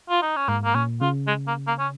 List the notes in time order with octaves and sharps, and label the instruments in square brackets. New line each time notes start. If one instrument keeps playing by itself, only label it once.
[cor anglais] F4
D#4
C#4
[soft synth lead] G#2 [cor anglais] A#3
[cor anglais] A#3
[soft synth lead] A#2 [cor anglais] C#4
[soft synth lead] C#3 [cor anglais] F4
[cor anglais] G#3
A#3
A#3
C#4